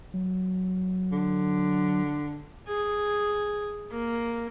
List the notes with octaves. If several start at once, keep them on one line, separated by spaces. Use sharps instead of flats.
F#3
D3
G#4
A#3